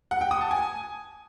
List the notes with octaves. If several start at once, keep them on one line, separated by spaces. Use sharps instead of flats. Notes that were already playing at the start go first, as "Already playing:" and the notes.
F#5
G5
D#6
A5
G#5